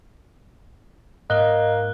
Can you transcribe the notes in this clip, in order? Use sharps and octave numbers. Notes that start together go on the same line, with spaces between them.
G#2 A#3 D#5 F#6 G7